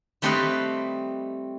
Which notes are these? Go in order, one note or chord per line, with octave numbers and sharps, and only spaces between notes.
G3 A3 C4 G4 B4 D#5